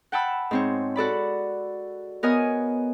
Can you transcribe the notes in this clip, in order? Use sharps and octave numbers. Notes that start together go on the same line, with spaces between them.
F#5 G5 A5 B5 E6
G#2 C4 C#5
F#4 A4 D5 B5
B3 A#4 C#5 D#5 G#5